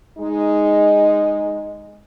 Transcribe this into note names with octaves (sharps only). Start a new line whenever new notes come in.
G#3 D#4